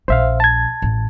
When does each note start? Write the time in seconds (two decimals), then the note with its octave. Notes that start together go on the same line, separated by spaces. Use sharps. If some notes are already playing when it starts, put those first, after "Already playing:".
0.08 A#1 C5 E5 F5
0.40 A5 G#6
0.82 A1